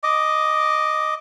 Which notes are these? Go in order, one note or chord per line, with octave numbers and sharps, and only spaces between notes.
D#5 D6